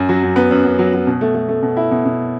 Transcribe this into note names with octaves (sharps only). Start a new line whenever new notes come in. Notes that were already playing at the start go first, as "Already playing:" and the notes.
Already playing: F#2
F#3
F#2
B3
F#2
F#2
F#3
F#3
B2
A3
A3
A3
B2
E4
B2
B2